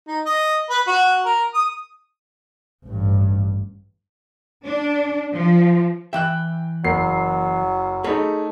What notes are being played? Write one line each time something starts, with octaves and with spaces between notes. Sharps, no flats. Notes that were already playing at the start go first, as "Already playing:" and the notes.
D#4
D#5
B4
F#4
A#4
D#6
A1 G2
D4
F3
E3 E5 G5 F#6
F#1 F#3 A#3 C7
A3 D#4 G#4 C#5 B5